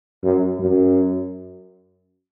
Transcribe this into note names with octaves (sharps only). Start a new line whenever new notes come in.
F#2
F#2